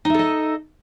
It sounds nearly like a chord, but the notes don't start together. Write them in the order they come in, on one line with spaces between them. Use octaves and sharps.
D#4 E5 A4 D#5